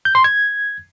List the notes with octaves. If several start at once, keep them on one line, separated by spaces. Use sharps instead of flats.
G6
C6
G#6